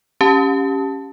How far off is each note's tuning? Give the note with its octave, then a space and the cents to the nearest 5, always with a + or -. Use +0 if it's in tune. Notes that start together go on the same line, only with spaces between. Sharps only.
C#4 +0 G4 +0 A5 +0